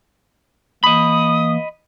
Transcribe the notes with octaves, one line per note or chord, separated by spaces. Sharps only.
E3 A#3 D#5 B5 D#6